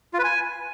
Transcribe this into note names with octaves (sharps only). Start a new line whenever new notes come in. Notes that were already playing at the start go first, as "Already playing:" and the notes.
F4
B4
G#5